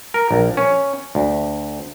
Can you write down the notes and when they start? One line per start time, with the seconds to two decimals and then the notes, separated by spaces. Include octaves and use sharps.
0.14 A#4
0.31 A#1
0.57 C#4
1.15 D2